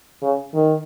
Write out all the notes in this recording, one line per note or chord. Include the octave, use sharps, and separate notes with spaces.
C#3
D#3